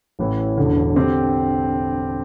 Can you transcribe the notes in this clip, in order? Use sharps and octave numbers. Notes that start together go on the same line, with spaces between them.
A1 A2 E3
E1 E2 D3
D3 C4 G4